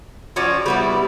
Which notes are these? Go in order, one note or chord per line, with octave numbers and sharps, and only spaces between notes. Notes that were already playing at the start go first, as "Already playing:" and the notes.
F3 C#4 F#4 D5
G3 B3 E4